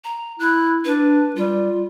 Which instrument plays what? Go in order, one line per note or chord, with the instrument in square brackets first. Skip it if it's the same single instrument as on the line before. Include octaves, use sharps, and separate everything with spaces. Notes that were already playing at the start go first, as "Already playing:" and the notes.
[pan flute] A#5
[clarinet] E4 [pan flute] F#6
[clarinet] D4 [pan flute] B4
[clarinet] G3 [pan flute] F4